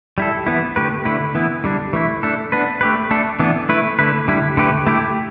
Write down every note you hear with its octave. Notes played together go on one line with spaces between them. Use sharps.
G3 E4 A4
E3 B3 E4
D3 A3 G4 B4
D3 A3 E4 B4
E3 B3 E4
D3 G3 D4
E3 A3 E4
A3 D4 A4
B3 D4 B4
A3 G4 B4
A3 D4 A4
E3 B3 D4 A4
A3 E4 B4
D3 A3 E4 B4
D3 G3 E4
D3 A3 G4 B4
A3 E4 G4